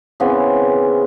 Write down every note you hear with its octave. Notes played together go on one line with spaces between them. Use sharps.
C#3 E3 B3 C4